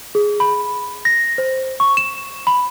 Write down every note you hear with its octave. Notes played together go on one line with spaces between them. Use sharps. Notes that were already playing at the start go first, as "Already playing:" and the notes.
G#4
B5
A#6
C5
C#6
E7
B5